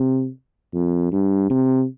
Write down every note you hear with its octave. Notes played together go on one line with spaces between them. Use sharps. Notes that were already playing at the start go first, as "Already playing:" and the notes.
Already playing: C3
F2
G2
C3